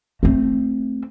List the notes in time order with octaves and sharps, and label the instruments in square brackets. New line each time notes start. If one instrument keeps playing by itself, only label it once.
[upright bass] A3 C4